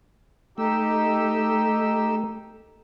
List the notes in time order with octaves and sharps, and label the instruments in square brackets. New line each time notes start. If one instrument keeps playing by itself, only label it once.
[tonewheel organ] A3 [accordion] D#4 G4 E6